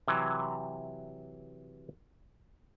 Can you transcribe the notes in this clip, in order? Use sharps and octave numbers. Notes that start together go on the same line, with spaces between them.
C3 E3 F#3